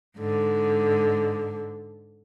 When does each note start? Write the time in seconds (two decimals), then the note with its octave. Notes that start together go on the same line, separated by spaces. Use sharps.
0.18 G#2 D3